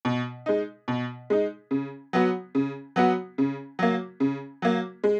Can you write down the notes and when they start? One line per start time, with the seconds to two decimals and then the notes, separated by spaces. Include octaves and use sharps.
0.05 B2
0.46 G#3 D#4
0.88 B2
1.30 G#3 D#4
1.71 C#3
2.13 F#3 B3 F#4
2.55 C#3
2.96 F#3 B3 F#4
3.38 C#3
3.79 F#3 A#3
4.20 C#3
4.62 F#3 A#3
5.04 G#3